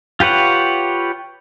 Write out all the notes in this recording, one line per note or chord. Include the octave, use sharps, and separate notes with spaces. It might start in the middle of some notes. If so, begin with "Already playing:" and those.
F4 G4 B4 C#5 F#5